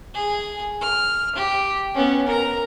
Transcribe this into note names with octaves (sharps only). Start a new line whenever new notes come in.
G#4
F6
G4
B3 C#4
A#4 A#5